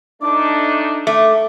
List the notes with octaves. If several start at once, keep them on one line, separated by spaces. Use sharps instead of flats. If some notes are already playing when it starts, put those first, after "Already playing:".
A3 D4 D#4 D6
A3 D6